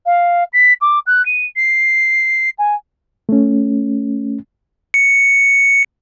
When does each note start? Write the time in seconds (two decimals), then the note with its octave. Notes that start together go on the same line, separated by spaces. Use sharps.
0.06 F5
0.53 B6
0.81 D6
1.07 F#6
1.26 D#7
1.56 C7
2.59 G#5
3.29 A3 C#4
4.94 C#7